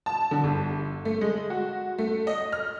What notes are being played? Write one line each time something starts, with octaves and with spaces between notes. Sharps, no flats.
A5
D3
G1
A3
G#3
F#4
A3
D#5
F6